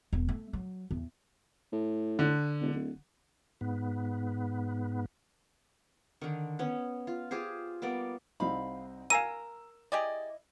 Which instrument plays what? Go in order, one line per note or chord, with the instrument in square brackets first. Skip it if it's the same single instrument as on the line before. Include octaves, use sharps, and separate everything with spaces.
[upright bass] E1
A3
F#3
E2
[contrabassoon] A2
[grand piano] D3
[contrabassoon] E1
D1
[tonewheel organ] G#2 B3
[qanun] D3 D#3
B3 C#4
F4
F4 G4 G#4 C5
G3 A#3 B3 D5
[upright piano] C2 C4 D#4 [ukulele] F5 B5
[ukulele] A#4 [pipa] F5 G#5 A#5 [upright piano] E6 E7 [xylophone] D#7
[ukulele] E4 D#5 [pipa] G4 G#4 D5